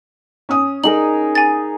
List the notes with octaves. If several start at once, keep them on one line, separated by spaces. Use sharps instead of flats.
C#4 D#6
D#4 G#4 A#4 F#7
G#5 A6